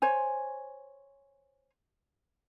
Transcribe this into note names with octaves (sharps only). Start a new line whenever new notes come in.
C5 C#5 G#5